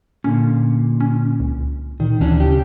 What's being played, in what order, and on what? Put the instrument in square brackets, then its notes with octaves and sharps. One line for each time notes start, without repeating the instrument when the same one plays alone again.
[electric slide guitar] A#2 D3 [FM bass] C#4
[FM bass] C#4
C#2
[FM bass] A#2 [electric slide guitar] D#3
[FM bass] D2 [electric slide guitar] E3 C#4 D4
[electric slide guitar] C#3 G4